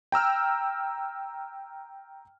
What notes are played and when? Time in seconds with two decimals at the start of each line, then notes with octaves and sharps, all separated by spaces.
0.12 G5 A#5 E6 F6